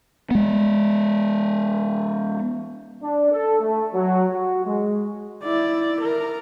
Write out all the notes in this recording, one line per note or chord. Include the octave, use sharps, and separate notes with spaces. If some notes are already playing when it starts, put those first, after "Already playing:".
G#3 B3
D4
A4
A3
F#3
F#4
G#3
E4 D5
A#4